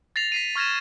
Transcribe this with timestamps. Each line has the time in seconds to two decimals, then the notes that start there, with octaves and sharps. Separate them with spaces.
0.16 A6 A#6 C7 F7
0.32 B6 C7 D#7
0.56 C#6 F6 G#6 A#6 E7